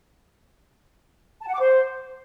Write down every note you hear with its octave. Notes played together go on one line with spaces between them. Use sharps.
A5
F#5
D6
C5